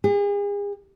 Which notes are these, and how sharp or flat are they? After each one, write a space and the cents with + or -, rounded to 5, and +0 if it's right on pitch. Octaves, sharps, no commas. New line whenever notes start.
G#4 -40